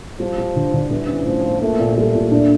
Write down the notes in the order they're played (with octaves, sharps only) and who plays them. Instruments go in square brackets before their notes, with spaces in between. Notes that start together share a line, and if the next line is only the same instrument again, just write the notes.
[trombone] F3 [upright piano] G3
[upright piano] G3
D3
D3
[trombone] E3 [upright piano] G3
[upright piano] C#4
[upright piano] A2 [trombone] F3
[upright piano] F4
[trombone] A3 [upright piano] A#3
[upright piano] A#2
[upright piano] G3 [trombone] A3
[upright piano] A#2
D4